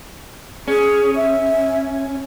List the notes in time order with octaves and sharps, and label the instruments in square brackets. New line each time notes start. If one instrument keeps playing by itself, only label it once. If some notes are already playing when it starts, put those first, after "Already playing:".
[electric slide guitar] C#4 [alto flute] G#4
[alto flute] E5